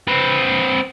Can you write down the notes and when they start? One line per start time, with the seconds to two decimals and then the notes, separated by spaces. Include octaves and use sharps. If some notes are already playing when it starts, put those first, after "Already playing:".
0.08 C4 B4